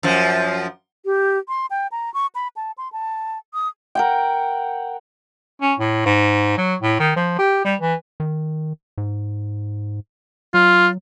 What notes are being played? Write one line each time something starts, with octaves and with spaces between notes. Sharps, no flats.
F#2 F3
G4
C6
G5
A#5
C#6
B5
A5
C6
A5
D#6
A#4 F#5 G5
C#4
A2
G#2
F#3
A2
D#3
F3
G4
G3
E3
D#3
G#2
F#3 F4